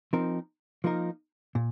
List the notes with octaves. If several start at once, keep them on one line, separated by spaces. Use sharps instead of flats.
F3 C4 D#4 A#4
F3 A#3 D#4 A#4
A#2